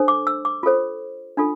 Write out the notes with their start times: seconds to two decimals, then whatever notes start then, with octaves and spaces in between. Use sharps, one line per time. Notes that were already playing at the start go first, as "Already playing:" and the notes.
Already playing: D4 A4 C5
0.08 D6
0.27 E6
0.45 D6
0.63 F4 A4 C5
1.37 D4 F4 A4